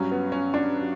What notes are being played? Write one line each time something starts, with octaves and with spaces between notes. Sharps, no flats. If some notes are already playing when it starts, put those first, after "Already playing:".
Already playing: G2 F#3 C#4
B3
C#4
D4
F#3